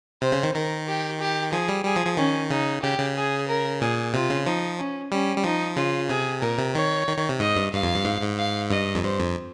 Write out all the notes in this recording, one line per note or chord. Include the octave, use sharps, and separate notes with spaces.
C3 C5
C#3
D#3
D#3 A#4
G4
G4
F3 G#4
G3
G3 G#4
F3
F3
D#3 C#4
C#3 D#4
C#3 G4
C#3
G#4
A#4
A#2 G#4
C3 F4
C#3
F3 D#4
C#4
G3 C#4
G3
F3 D#4
C#3 F4
C3 G#4
A#2 A#4
C3
D#3 C#5
D#3
D#3
C3
G#2 D#5
G2
G2 F5
F2
G2
G#2
G#2
F5
G2 D#5
F2
G2 C5
F2